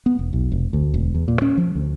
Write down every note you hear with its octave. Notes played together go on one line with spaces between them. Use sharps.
B3
E1
B1
F1
D2
E1
E2
A#2
C#4
F3
D2